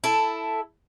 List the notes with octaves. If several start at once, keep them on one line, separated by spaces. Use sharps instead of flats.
E4 A4